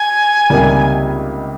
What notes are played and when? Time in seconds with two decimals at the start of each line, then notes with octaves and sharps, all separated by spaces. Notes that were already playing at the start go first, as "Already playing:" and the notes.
Already playing: G#5
0.50 C#2 C3 D#3 G3 A#3